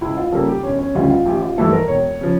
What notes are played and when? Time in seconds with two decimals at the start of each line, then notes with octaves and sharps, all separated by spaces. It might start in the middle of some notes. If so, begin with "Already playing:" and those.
0.01 C#2 E4
0.17 F4
0.32 C#3 G3 A#3 A4
0.48 G4
0.63 E1 C#4
0.79 C#4
0.95 D2 C#3 G3 C#4 F4
1.10 F4
1.26 A1 G4
1.42 F4
1.57 G2 E3 A3 E4 A4
1.73 A#4
1.88 E1 C#5
2.21 C#3 F3